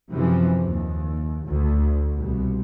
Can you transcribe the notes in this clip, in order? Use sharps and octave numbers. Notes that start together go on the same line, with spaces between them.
F#2 C3 E3 F3
D#2
D2
C2 B2